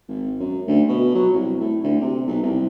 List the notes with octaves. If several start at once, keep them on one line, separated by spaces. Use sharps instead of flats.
G#1
F#2
D2
B2
F#3
C2
A2
D2
C3
B1
C2